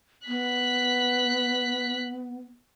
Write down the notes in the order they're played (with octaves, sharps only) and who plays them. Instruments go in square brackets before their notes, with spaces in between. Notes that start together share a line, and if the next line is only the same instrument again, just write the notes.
[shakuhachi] B3 [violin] F#6 B6